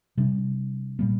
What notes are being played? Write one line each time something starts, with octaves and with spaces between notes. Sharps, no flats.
C3 G3 D4
A#2 G3 A#3